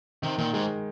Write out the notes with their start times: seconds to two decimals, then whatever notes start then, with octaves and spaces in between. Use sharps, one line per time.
0.22 C3 D#3
0.38 A#2 D#3
0.53 G#2 G#3